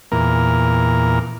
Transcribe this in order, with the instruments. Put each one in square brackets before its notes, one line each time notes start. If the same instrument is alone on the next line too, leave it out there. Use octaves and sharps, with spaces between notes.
[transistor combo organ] E2 A#2 A#4